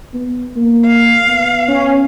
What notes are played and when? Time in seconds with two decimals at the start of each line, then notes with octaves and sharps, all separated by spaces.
0.14 B3
0.56 A#3
0.87 F5
1.27 B3
1.68 C#4